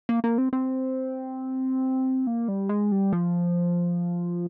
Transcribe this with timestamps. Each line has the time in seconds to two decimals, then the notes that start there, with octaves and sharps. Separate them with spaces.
0.09 A#3
0.24 A#3
0.38 C4
0.53 C4
2.27 A#3
2.48 G3
2.69 G#3
2.92 G3
3.13 F3